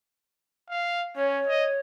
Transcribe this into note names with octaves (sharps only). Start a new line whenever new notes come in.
F5
C#4 C#5
D#5